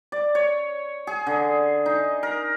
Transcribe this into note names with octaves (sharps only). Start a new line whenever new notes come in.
D5
C#5
G#4
D3
D#4
A#4